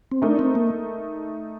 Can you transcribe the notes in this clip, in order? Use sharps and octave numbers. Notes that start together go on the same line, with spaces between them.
C4
A3 D4 D#4 A#4
C4
A#3